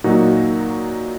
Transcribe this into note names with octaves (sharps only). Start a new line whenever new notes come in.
A#2 F#3 A#3 D#4 F#4